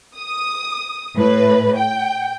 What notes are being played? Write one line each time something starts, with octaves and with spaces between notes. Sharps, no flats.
D#6
A2 B4
G5